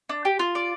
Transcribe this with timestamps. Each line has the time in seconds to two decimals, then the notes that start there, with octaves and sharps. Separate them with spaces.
0.09 D4
0.25 G4
0.39 F4
0.55 D5